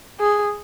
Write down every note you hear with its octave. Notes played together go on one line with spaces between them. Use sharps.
G#4